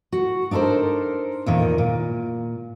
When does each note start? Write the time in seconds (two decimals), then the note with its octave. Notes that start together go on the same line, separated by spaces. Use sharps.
0.12 F#4
0.51 D4 D#4 A4 A#4 C5
1.46 E2 A#2 D#3
1.78 A#2